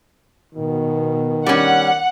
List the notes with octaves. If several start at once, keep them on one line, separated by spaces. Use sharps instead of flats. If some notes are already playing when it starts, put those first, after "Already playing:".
B2 D#3
G3 C#4 F#5